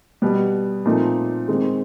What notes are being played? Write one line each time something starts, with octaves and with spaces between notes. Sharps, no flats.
B2 G3 B3
A#2 F3 A3 C4 D#4
D#3 G#3 C4